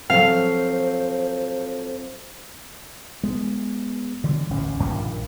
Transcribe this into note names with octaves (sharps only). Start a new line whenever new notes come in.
F3 F#3 C4 A4 C5 F5
G#3 B3
D3 E3 F#3 G3
D1 A1 E2 C#4
A#1 G2 A#2 D#3